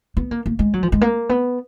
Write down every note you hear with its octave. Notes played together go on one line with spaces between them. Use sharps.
B3
A#3
A#3
G#3
F#3
F3
G#3
A#3
B3